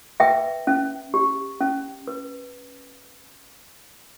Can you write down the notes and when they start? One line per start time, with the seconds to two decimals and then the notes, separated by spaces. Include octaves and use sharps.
0.20 B4 E5 G5
0.67 C#4
1.14 G4
1.61 C#4
2.07 B4